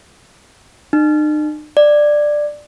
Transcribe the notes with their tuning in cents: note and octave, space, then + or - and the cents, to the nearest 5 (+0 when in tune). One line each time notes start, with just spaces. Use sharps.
D#4 -45
D5 +10